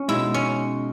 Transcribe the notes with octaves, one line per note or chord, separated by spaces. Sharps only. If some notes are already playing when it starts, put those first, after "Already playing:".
Already playing: C#4
B2 G#3 D#4 E4
C#4